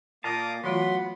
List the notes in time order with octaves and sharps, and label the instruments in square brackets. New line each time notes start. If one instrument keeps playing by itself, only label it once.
[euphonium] A#2 [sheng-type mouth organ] A#3 D6 D#6 [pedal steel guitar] D#5 F5 A5
[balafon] E3 A3 F4 [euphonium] F#3 [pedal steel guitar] B3 [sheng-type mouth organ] F#5 B5 C6